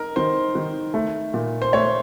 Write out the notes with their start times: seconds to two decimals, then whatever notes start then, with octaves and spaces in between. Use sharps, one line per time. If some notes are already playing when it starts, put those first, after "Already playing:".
Already playing: D#4 A#4
0.16 D#3 C5
0.55 D#3
0.94 A3
1.34 A#2
1.62 C5
1.73 A3 C#5